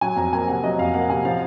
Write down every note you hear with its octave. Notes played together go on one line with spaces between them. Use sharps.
F#3 G#5
F2 A#5
A#3 G#5
C3 F#5
F#3 D#5
F2 F5
A#3 F#5
C3 G#5
F3 F5